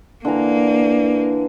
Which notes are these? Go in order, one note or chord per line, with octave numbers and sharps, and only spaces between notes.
D3 E3 A#3 A#5